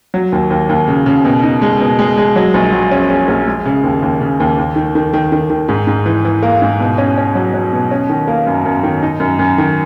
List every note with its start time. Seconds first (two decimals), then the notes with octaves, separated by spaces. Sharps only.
0.14 F#3
0.32 D#2
0.50 D#2
0.69 D#2
0.88 C#3
1.06 C#3
1.25 B2
1.43 D#4
1.62 G#3
1.80 B2
1.99 G#3
2.18 G#3
2.36 F#3
2.54 A#1
2.73 F#3
2.91 C#4
3.10 C#4
3.28 A#1
3.47 G#3
3.66 C#3
3.84 D#2
4.02 D#2
4.21 C#3
4.40 D#2
4.58 D#2
4.76 D#3
4.95 D#3
5.13 D#3
5.32 D#3
5.50 D#3
5.69 G#2
5.87 G#2
6.06 E3
6.25 E3
6.42 A#3
6.62 G#2
6.80 B2
6.98 C#4
7.18 C#4
7.35 F#3
7.54 F#3
7.73 B2
7.91 C#4
8.10 D#3
8.28 A#3
8.47 F#2
8.65 F#2
8.83 D#3
9.03 D#4
9.20 F#2
9.39 F#2
9.58 D#3